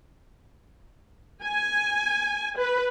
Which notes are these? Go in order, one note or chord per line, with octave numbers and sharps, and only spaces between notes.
G#5
B4